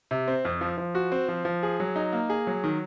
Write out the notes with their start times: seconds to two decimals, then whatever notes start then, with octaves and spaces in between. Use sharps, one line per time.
0.11 C3
0.28 C4
0.45 F2
0.61 F3
0.78 F3
0.95 F#4
1.12 C4
1.28 F3
1.45 F3
1.63 G#4
1.80 F#3
1.96 D#4
2.13 A#3
2.30 G#4
2.47 F#3
2.64 D#3